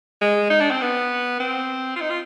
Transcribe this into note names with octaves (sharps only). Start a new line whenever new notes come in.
G#3
D#4
D4
C4
B3
C4
F4
D#4
F4